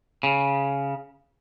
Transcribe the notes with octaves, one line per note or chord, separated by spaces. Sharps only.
C#3